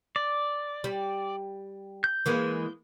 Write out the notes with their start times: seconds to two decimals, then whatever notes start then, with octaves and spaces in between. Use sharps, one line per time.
0.16 D5
0.84 G3
2.04 G6
2.26 E3 G#3 A#3